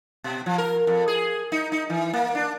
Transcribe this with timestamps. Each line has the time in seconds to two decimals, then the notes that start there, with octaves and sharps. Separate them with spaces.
0.24 B2
0.46 F3
0.58 A#4
0.87 F2
1.08 G#4
1.52 D#4
1.72 D#4
1.90 E3
2.13 A#3
2.35 D4